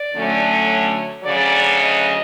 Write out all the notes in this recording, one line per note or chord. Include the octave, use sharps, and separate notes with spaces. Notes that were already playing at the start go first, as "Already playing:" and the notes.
Already playing: D5
D3 F#3 A3 C#4
C#5
D2 C#3 F#3 D5
D#5